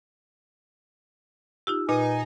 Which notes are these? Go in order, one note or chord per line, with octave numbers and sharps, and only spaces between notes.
D#4 F4 G4 E6
A#2 D#4 B4 G#5